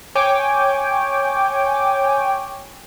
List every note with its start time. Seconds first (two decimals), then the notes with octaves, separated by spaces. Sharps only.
0.15 C#5 G5 G#5 D6